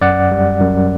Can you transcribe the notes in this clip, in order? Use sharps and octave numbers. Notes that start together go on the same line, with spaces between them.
F#2 D5 F#5
G3
F#2